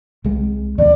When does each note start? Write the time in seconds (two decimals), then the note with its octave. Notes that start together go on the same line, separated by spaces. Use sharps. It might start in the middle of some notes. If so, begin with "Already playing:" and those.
0.24 C2 G#3
0.78 D#2 C3 D5